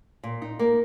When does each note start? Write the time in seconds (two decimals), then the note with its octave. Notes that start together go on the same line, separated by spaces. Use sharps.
0.23 A#2
0.42 D#4
0.59 A#3